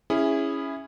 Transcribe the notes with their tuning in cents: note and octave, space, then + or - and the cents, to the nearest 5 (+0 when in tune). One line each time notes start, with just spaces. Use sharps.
C#4 +5 E4 +0 G#4 -15